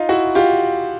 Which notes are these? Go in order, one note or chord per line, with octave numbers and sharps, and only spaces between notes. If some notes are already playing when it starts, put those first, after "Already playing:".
Already playing: D#4 F4
E4 F#4
F4 G4